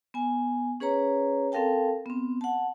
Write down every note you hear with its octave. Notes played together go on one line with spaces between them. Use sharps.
B3 G#5
C#4 G#4 B4 C#5 A#5
C4 A4 A#4 F5 G5 A5
B3 C4
F#5 A5